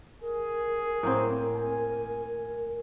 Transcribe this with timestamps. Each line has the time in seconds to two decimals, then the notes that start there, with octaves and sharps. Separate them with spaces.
0.22 G#4 A#4
1.03 A2 A#3 C4
1.55 G#5